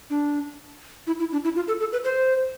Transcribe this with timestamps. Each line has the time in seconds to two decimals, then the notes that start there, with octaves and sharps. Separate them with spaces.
0.10 D4
1.07 E4
1.20 E4
1.32 D4
1.44 E4
1.56 F4
1.68 A4
1.80 A4
1.92 B4
2.04 C5